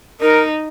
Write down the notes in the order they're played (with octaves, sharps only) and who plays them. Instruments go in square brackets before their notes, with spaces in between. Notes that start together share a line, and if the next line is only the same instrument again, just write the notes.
[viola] D#4 [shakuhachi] A#4